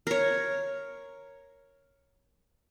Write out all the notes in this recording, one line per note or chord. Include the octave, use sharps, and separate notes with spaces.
A#4 C#5